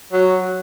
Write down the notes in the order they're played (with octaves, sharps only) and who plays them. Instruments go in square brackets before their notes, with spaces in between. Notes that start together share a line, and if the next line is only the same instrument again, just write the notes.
[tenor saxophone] F#3